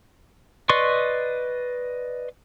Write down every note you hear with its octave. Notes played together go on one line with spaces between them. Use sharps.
B4 D5 D#5 C6 C#6